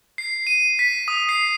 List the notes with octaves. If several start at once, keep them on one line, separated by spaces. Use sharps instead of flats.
C7
D#7
B6
D#6
C7